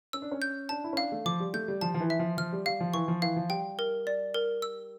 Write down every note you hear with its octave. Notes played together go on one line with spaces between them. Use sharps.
C#4 E6
D4
C#4
G6
D4 A5
E4
C#4
D4 F5
A3
F3 D6
G3
A3 G6
G3
F3 A5
F3
E3
E5
F3
F3 F6
G3
G3 F5
F3
E3 C#6
F3
E3 F5
F3
G3 G5
A#4
D5
A#4
E6